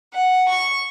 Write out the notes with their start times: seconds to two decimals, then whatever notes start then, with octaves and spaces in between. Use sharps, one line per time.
0.13 F#5
0.48 C#6